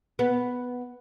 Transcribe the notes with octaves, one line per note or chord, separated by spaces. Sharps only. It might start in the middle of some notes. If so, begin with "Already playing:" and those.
B3